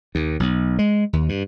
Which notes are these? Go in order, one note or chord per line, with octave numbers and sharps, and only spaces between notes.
D#2
B1
G#3
D#2
G2